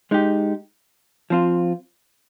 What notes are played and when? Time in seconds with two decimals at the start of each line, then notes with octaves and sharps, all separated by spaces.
0.11 G#3 D#4 G4
1.30 F3 C4 F4